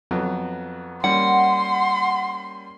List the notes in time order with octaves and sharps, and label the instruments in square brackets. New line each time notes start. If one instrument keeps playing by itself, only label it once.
[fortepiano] F2 F#3 B3
[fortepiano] G3 A#3 C#4 [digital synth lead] F#5 [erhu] C6